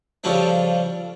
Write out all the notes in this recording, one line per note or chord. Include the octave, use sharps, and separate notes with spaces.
F2 C#3 F3 G3 C#4 D4